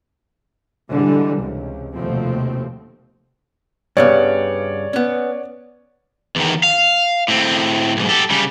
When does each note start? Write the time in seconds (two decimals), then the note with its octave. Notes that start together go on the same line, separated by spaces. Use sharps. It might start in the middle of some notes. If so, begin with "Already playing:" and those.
0.89 G#2 D3 E3 G3 G#3
1.36 C#2 C3
1.95 F1 D#2 B2 F3 A3 C4
3.97 G2 C#3 B3 C#5 D5
4.93 B3 C#4
6.36 E2 D#3
6.63 F5
7.28 A2 C4
7.97 B1 G#2
8.09 G4 A4
8.31 C#3 G3